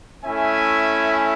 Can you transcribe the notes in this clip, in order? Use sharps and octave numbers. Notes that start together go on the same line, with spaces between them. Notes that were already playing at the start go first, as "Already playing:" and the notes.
A3 C#4 E4 E5 G#5